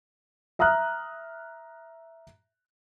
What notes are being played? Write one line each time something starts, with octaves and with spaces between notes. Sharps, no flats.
E5 A#5 D#6 F6 F#6